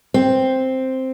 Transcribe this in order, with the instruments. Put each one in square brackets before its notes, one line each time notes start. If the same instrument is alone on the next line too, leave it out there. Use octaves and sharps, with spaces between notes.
[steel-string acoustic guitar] C4